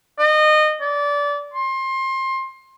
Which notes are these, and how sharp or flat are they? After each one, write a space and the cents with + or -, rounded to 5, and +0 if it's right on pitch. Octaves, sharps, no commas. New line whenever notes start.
D#5 -25
D5 -25
C6 +25